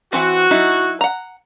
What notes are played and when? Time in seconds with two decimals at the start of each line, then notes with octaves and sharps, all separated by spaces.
0.13 E3 C4 F#4
0.51 F#3 D#4 E4
1.01 F#5 A#5